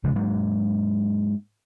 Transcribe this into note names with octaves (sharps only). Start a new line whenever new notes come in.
D#1 C#3 F3 G#3
G#2 F#3 A#3